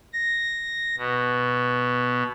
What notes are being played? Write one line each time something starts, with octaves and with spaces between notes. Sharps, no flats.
A#6
B2